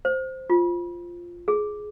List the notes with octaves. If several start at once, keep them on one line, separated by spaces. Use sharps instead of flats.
C5
F4
G#4